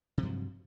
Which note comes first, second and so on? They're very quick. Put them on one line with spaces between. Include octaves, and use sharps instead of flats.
C3 F3 G2 F#3